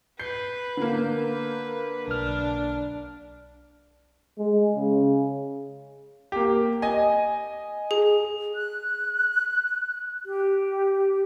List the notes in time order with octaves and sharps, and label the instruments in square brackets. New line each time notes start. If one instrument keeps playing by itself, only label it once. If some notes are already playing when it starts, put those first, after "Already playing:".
[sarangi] B4 [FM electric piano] G6 [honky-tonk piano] C7
[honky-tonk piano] D3 A#3
[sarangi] B4
[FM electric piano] B1 F6 [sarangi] D4
[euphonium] G#3
C#3
[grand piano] A#3 G4
D#5 G#5
[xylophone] G#4
[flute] F#6
G4